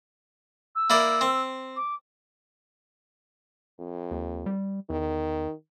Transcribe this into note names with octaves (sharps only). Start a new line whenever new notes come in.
E6
A#3 E4 D5
C4
D6
F2
D#2
G3
E2 D#3